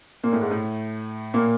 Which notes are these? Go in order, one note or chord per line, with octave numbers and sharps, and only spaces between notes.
A#2 A#3
A2 A3
G#2 G#3
A2 A3
A#2 A#3